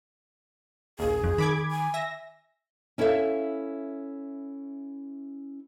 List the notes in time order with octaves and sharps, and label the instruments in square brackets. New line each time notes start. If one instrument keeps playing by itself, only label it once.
[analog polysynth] A#1 D#2 [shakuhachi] G#4
[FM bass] F2
[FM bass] D#3 [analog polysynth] B5 D6 G#6
[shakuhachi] G#5
[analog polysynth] E5 A#6
[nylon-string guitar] C#4 E4 A4 C5 E5 F5